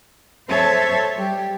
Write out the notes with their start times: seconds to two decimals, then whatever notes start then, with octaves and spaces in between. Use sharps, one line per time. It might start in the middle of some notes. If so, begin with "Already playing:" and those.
0.50 A4 C5 C#5 E5 A5
1.16 G3 G4